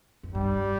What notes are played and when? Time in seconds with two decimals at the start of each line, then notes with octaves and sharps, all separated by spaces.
0.23 F2
0.34 G2 G3